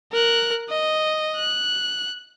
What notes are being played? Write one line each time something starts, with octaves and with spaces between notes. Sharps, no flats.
A#4 F#6
D#5
F#6